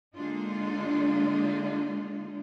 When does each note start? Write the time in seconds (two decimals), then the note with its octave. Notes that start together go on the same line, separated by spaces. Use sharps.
0.15 D3 G#3 A#3 D4 D#4 F4